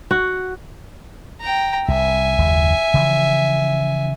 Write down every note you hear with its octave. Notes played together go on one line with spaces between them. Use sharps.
F#4
G5 A#5
C2 E5 G#5
F#1 D#2 G#3
C#3 E3 F3